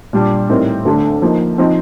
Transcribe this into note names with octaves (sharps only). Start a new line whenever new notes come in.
A#2 G3 D4
A2 G3 C4 D#4 A#4
D2 D3 A3 D4
F3 A#3 D#4
F3 C4 D#4